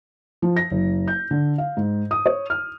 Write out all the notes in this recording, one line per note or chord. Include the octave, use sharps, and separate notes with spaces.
F3
A#6
F#1
G6
D3
F5
G#2
D#6
C#5
F6